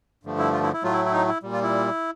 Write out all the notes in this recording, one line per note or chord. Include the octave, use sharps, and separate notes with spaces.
G2 D3 F3 A3
E4
F4
E4
E4
A2 F#3 A3 F4
E4
E4
D#4
E4
A#2 G3
F4
E4